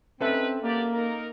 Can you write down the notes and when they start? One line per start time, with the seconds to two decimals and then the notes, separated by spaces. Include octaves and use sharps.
0.21 G3 C4 C#4 D#4 A4 B4 E5
0.63 F#3 A#3 G4 D5
0.94 D#4 A#4